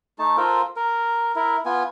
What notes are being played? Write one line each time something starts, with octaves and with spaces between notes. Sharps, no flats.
A3 D#4 A5
F4 A4 A#4 C5
A#4
E4 A#4
B3 F4 G#5